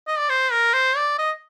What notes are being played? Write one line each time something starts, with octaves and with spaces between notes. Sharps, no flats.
D#5
D5
C5
A#4
C5
D5
D#5